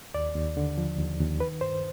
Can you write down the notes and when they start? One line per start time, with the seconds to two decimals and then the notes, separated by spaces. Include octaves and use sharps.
0.14 D#2 D5
0.35 D#2
0.57 D3
0.78 F3
0.98 D#2
1.20 D#2
1.40 D#3 B4
1.61 G2 C5